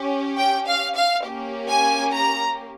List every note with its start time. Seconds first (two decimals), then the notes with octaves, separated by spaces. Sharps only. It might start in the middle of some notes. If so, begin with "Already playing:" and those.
Already playing: C#4 G4
0.38 G5
0.67 F5
0.96 F5
1.25 A#3 C#4 G4
1.69 G#5
2.13 A#5